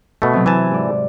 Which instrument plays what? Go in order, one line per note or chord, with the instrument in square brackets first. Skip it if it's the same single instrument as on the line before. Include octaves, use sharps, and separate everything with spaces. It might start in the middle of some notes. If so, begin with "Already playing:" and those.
[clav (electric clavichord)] B2 A3
[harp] C3 F#3
[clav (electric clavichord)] E3 G#5 A5
[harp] G#2 D5